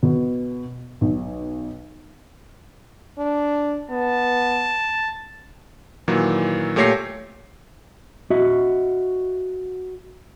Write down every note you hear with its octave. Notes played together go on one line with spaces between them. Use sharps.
B2
B1
D4
B3 A5
A#2 D#3 E3 F#3
A#2 A3 G4 C#5 A#6 C7
F#4 D#5 E5